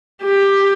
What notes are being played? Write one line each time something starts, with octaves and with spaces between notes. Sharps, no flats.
G4